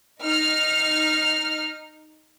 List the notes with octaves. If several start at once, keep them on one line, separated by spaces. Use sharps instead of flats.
D#4 F6